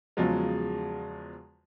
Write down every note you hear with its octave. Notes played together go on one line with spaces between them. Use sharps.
E2 C#3 F3 F#3 G#3